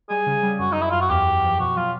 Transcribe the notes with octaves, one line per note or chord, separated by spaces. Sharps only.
G3 G#4
C#3
G3
F#2 F#4
F#2 D#4
E4
F#2 F4
F#4
E2 G4
E2
F3
B2 F#4
F#3 F4